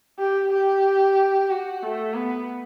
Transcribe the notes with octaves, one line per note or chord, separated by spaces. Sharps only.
G4
G4
F#4
A3
B3